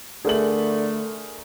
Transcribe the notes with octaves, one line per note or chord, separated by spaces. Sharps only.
D3 A3 G#4 A#4 F#7